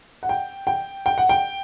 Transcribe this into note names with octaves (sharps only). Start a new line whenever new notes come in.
F#5
G5
G5
G5
F#5
G5